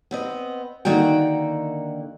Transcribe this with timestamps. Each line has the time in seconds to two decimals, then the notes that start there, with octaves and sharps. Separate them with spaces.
0.11 B3 C4 D#5
0.85 D3 D#3 A#3 F#4 G5